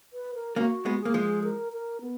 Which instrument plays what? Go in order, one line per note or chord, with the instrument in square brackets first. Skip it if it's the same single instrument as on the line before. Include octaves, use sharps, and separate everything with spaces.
[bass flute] B4
A#4
[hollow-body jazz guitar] A#3 C#4 [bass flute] F#4
[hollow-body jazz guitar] G#3 B3
[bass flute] G#4
[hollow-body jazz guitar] A#3
F3 G#3
[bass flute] A#4
A#4
B3